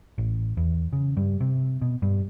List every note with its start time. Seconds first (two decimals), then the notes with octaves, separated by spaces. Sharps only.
0.18 A1
0.57 E2
0.93 C#3
1.17 G2
1.40 C3
1.82 B2
2.02 G2